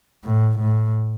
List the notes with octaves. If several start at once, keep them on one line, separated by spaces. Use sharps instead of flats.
A2
A2